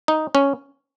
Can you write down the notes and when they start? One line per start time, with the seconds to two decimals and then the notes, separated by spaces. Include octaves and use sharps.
0.08 D#4
0.35 C#4